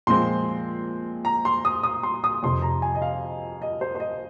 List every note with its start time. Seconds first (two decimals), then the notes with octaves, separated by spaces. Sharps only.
0.07 A#2 F3 G#3 C4 C6
1.25 A#5
1.45 C6
1.65 D#6
1.83 D#6
2.03 C6
2.24 D#6
2.43 F2 C3 F3 C6
2.62 A#5
2.82 G#5
2.95 D#5
3.02 F5
3.62 D#5
3.81 C5
3.95 C5
4.00 D#5